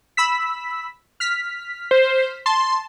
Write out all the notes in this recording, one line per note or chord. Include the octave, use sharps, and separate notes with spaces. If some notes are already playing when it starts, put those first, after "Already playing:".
B5 E6 B6
F6 B6
C5
A5 C6